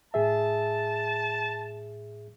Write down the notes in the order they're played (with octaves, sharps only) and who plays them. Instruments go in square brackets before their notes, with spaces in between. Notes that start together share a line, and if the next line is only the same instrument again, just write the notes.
[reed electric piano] A2 G#4 E5 [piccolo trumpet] A5